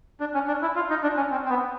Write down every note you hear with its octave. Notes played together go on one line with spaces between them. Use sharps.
D4
C#4
D4
E4
F4
D#4
D4
C#4
C4
C4
B3